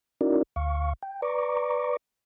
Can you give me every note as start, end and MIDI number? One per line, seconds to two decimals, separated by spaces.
0.21 0.43 61
0.21 0.43 63
0.21 0.43 64
0.21 0.43 66
0.21 0.43 70
0.21 0.43 74
0.56 0.93 38
0.56 0.93 77
0.56 0.93 85
1.02 1.21 79
1.22 1.97 71
1.22 1.97 74
1.22 1.97 82
1.22 1.97 85
1.22 1.97 86